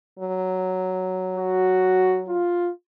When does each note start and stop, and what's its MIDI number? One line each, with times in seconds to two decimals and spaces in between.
0.19 2.40 54
1.36 2.21 66
2.28 2.70 65